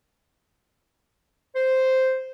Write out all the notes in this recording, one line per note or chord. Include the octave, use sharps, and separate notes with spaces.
C5